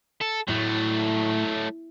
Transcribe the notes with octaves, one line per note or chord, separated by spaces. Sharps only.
A4
A2 F#3 A3